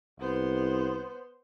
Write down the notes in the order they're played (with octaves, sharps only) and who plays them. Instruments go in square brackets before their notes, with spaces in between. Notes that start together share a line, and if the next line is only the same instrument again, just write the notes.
[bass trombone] C2 [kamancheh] B3 C5